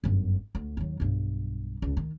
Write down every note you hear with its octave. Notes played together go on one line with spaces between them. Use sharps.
G1 F#2
D2
D#2 F#3
B1 G2
C#2
D#3